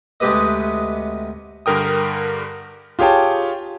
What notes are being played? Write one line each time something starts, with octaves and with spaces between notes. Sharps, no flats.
D2 C3 G#3 G4 B4 D#5
G2 D3 A#4 G5 D#6
F4 G4 G#4 C#5 G5 A5